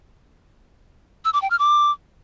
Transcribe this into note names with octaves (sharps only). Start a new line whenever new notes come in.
E6
D6
G5
F6
D6